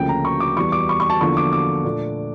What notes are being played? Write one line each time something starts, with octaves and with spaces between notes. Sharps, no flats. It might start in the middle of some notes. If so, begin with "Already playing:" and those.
Already playing: D2 C#3 F3 A#3 G5
A#5
C#6
D6
E2 E3 G3 C#6
D6
C#6
C#6
A5
E2 D3 F3 A#3 C#6
D6
D6
A#2 A3 D4